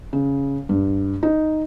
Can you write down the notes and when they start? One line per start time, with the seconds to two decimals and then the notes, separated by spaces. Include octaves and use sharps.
0.13 C#3
0.69 G2
1.23 D#4